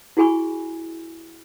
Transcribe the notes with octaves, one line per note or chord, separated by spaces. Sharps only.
E4 F#4 G#4 G#5 B5 C#6